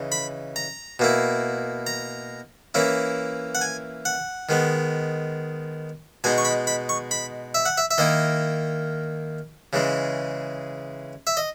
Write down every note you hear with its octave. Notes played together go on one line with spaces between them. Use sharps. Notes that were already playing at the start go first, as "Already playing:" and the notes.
Already playing: C#3 E3 D#4
B5
A#5
B2 A#3 E4
A#5
E3 A#3 C#4 E4
F#5
G#5
F#5
D#3 G#3 B3
B2 G#3 D#4 G#5
C#6
B5
B5
C#6
B5
E5
F#5
E5
E5
D#3 A#3 E4 D#5
C#3 E3 G#3
E5
D#5